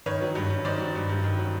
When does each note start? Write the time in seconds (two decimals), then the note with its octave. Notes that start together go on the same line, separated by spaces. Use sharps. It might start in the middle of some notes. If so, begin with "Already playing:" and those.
0.06 D#3 B4 C#5
0.21 F#3
0.35 G2
0.50 G2
0.65 D#3 C5 D5
0.80 F#3
0.95 G2
1.09 G2
1.24 D#3
1.39 F#3